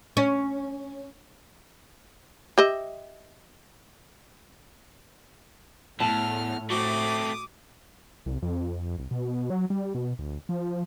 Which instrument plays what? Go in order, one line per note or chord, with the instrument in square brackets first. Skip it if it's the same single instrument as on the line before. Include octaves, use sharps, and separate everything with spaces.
[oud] C#4
[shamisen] G4 D#5 E5
[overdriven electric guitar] E2 [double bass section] A2 [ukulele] A5 [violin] F6
[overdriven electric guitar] A3 C4 [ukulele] F#4 [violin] D6 D#6
[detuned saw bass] C2
F2
C2
B2
F#3
G3
B2
D2
F3